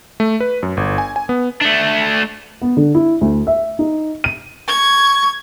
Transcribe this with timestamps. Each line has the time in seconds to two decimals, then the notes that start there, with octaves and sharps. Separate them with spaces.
0.20 A3
0.40 B4
0.63 F#2
0.77 G1
0.98 G#5
1.16 G#5
1.29 B3
1.61 A3 D4
2.62 B3
2.77 D3
2.95 E4
3.21 D2
3.47 E5
3.79 D#4
4.24 D#7
4.68 C#6 G#6